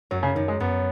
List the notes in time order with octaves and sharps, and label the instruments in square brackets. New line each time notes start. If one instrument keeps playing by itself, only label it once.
[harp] F#2 [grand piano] F#3
[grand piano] C#3
[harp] F#2 [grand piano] D#3
[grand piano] G#3
[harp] F#2 [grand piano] B3